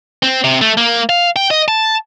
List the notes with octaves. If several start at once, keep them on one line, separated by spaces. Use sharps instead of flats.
C4
C3
A3
A#3
F5
G5
D#5
A5